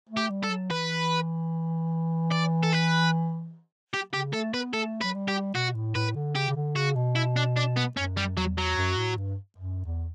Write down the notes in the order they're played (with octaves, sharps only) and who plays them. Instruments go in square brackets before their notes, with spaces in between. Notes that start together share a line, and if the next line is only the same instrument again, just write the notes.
[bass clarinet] A3
[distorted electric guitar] G4
[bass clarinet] G3
[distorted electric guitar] A4
[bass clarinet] F#3
[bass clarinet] E3 [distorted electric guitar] B4
[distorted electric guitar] D5
A4
B4
G4
[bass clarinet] C#3 [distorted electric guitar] G4
[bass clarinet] A3 [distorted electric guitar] A4
[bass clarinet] B3 [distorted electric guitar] B4
[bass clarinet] A3 [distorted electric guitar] A4
[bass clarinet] F#3 [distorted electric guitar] B4
[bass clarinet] G3
[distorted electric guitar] G4
[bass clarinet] B2 [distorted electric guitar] F#4
[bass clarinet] A2
[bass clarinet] A2 [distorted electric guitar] B4
[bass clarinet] D3
[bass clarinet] C#3 [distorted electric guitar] G4
[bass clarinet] C#3
D3
[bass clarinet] C#3 [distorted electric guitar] F#4
[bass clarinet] B2
[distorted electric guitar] E4
D4
D4
B3
[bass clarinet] F#2 [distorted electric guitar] C#4
[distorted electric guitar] G3
[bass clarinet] E2 [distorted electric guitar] F#3
[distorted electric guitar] F#3
[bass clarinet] F#2
A2
G2
F#2
E2